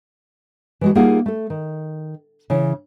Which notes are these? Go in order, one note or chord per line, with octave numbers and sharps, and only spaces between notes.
E3 G#3 F#4
G3 A#3 D#4 F4 G#4 F#5
A3 A4
D#3
C#3 E3